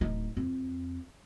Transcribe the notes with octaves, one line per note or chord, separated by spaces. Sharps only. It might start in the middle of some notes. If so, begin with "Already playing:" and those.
D1 D#4
F2